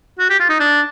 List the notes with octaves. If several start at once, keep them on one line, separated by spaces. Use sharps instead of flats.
F#4
G4
F4
D#4
D4